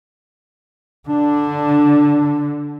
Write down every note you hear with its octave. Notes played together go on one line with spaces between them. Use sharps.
D3 D4